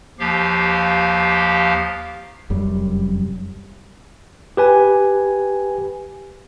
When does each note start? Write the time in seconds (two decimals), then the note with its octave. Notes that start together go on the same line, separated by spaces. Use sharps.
0.19 D#2 F3 G4 F5
2.50 F1 F#2 G3
4.57 G4 B4 G#5